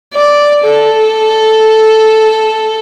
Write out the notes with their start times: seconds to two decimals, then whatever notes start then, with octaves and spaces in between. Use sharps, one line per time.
0.14 D5
0.64 A4